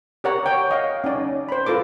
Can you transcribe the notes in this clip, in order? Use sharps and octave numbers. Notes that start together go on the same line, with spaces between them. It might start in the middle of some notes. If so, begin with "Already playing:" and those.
G4 A#4 C#5 D5 F#5 A#5
C#5 G5
D#5 F5 F#5
C#4 D#4 D5
C5 B5
F4 A4 B4 D6